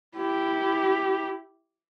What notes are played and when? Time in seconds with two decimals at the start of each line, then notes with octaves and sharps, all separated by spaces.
0.16 E4 G4